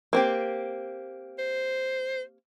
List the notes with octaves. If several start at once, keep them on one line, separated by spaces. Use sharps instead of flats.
A#3 C4 G4
C5